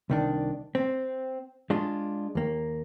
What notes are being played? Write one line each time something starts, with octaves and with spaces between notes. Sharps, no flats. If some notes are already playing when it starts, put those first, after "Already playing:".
C2 D#3 D4
C4
G#3 D4 F4
D#2 A#3